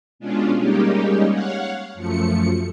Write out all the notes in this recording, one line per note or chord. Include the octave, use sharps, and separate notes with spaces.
B2 G#3 C#4 D4 F4
G3 G#3 A#3 C#4 D#4 G4
C#5 F5 F#5
F#2 F3 A3 C#7